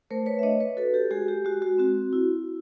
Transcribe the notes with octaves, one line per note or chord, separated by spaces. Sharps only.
A3 A#4 C5
B4 C#5
E5
D4 C#5 D#5
B4 C#5
F#4 A4 B4
G4 A4
G#3 F#4 G#4
G4
G#3 F#4
F#4
C4 F#4
E4